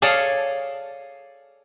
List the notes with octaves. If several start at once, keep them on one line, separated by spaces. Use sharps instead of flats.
G#4 A4 C#5 D5 F5